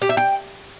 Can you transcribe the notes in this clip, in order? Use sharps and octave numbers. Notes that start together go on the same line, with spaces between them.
G4
E5
G5